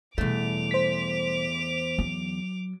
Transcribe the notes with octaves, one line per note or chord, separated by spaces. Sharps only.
E2 B2 G3 A3 D6 F7
C5 B6
F#3